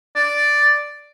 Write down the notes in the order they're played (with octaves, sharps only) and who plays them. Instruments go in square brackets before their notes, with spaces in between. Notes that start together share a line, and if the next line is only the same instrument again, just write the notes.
[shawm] D5